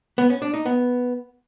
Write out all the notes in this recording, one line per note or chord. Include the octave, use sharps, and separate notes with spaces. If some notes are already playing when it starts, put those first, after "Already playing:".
B3
C#4
D4
D#4
B3